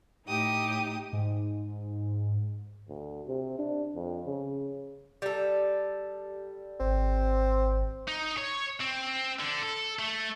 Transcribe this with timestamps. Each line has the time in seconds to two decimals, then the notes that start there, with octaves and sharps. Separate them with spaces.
0.26 A2 D#4 G4 D#6
1.13 G#2
2.89 D2
3.28 C3
3.58 D4
3.95 F2
4.26 C#3
5.22 G3 A4
6.80 G#1 C4
8.08 D#4
8.38 C#5
8.81 C4
9.40 D3
9.63 A4
9.99 A3